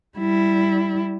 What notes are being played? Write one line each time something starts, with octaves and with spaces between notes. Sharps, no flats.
G3 E4